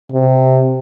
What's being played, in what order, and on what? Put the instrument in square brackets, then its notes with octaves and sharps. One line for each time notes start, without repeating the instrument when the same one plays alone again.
[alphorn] C3